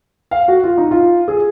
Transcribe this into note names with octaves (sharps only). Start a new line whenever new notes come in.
F5
F#4
F4
D#4
F4
G#4